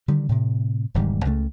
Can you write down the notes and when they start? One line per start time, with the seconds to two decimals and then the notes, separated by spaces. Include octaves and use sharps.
0.08 D3 D#3 G3
0.29 A2 C3
0.94 E1 G#2 D#3 G3
1.25 C#2 C#3 G#3 A3